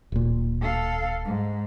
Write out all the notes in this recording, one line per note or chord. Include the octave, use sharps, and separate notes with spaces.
D1 A#2
A4 F5
G#2